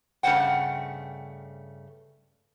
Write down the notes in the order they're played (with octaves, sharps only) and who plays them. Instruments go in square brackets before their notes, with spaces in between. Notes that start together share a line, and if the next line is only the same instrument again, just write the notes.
[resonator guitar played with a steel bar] G2 C#3 A3 C5 F#5 G5